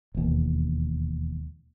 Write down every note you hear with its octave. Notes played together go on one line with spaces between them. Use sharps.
E1 D#2